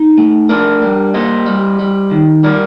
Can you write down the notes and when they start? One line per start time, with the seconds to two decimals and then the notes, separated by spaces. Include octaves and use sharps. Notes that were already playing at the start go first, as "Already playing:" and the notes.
Already playing: D#4
0.18 A3
0.49 D4 A#4 D5
0.82 G3
1.14 A#3 C5 D#5
1.46 G3
1.79 G3
2.11 D#3
2.43 G3 A#4 D5